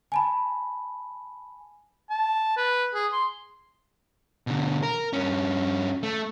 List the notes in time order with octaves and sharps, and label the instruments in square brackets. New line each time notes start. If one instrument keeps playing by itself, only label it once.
[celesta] G#5 A5 B5
[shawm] A5
B4
G#4
C6
[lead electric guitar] B2 D3
A#4
G2 C#4
A3